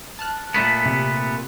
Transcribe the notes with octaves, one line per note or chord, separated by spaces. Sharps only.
A5 F6 F#6
A#2 A3 B3
C3